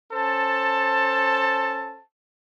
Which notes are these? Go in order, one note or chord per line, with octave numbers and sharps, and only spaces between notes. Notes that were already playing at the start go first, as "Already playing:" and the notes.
C#4 A4 C5 A5